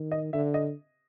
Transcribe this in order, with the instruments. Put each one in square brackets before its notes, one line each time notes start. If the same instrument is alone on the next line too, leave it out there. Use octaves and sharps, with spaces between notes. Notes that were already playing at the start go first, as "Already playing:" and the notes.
Already playing: [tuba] D#3
[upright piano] D#5
[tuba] D3 [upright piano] E5
[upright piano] D#5